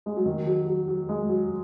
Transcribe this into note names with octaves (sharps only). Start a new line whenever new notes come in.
G#3
F#3
D#3
F#3
F#3
F#3
G#3
F#3